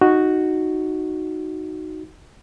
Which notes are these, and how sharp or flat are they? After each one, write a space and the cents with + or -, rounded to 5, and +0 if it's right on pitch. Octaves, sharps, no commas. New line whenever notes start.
D#4 +0 F#4 +0